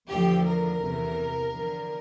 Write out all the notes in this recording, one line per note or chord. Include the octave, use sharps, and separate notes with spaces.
E2 D3 F3 A3 G4
A#4
E2 C3 E3 A3
E2 D3 F3